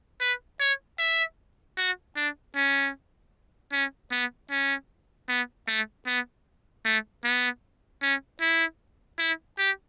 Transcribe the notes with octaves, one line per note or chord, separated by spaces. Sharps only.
B4
C#5
E5
F#4
D4
C#4
C#4
B3
C#4
B3
A3
B3
A3
B3
C#4
E4
E4
G4